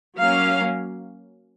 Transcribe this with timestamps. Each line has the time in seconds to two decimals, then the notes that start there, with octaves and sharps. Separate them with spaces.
0.18 F#3 A#3 C#4 F5